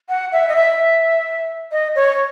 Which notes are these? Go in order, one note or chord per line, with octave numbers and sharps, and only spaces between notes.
F#5
E5
D#5
E5
D#5
C#5